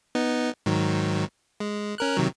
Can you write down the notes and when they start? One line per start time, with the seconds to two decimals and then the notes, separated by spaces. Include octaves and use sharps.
0.15 B3 D#4
0.66 G#2 D#3 F#3
1.60 G#3
1.98 C#4 A#4 F#6
2.17 C3 D#3 F#3